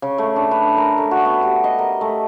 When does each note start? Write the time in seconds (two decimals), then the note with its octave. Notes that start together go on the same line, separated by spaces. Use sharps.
0.02 C#3
0.18 A3
0.36 D4
0.51 B4
0.77 A#4
0.98 A3
1.11 F#4
1.25 B3
1.43 G4
1.64 D#5
1.78 A#4
2.01 A3